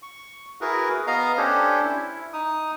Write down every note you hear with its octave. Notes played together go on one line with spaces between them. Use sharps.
C#6
E4 F#4 G#4 A#4 B4
B3 D#5 F5 A#5
C#4 D4 G4 A4 C5 C#5
E4
D#4 D#6